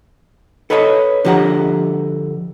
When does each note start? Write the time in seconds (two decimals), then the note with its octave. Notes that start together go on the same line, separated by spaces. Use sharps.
0.70 A4 B4 C#5 D#5 A#5 B5
1.25 D3 F3 G4 B4 F#5 A#5